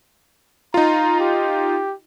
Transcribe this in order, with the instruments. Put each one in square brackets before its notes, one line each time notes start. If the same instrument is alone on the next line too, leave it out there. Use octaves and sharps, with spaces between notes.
[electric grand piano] D#4 F4 [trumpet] A#5
[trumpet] G4